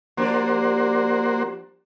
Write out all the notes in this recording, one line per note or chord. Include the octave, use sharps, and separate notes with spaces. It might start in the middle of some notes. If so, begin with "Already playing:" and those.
F3 G3 A#3 D4 F#4 C5